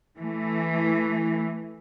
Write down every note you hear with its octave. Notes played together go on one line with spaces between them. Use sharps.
E3 A3